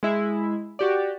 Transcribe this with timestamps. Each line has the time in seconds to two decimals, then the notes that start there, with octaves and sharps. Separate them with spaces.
0.03 G#3 E4
0.79 F#4 G4 D5